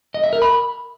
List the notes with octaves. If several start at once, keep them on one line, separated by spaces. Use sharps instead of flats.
D#5
E5
A#4
B5